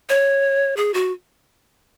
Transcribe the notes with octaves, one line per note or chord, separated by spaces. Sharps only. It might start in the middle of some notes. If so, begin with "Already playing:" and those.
C#5
G#4
F#4